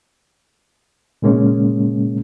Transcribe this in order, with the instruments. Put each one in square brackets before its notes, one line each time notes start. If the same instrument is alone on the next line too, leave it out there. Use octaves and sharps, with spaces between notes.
[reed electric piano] A#2 C#3 G#3 A#3 C#4